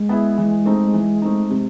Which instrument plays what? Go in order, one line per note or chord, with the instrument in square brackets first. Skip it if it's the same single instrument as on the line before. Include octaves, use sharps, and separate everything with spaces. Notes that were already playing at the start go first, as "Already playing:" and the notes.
Already playing: [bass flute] G#3
[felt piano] B3 E4 G#4
E3
A3 C4 D#4
E3
A3 C4 D#4
C3